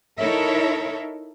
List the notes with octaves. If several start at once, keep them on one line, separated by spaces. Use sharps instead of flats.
D#4 E4 A4 A#4 C#5 E5